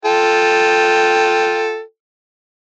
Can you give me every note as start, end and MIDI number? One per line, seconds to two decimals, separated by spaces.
0.05 1.81 65
0.05 1.81 69
0.05 1.81 79